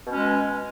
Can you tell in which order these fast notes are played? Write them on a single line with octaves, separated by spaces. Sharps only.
B2 C#4 G#3